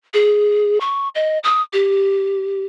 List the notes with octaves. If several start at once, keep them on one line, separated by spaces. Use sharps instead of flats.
G#4
C#6
D#5
D#6
G4